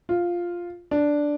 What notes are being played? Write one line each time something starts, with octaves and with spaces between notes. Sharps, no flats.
F4
D4